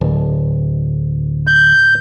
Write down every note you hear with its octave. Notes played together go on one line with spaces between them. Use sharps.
D1
G6